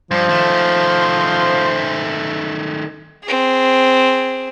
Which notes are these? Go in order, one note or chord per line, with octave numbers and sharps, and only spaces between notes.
G2 F3 C5
D#3 A3
C4 G#4